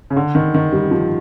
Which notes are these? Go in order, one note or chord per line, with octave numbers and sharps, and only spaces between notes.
C#3
D3
D#3
D#3
G3
F3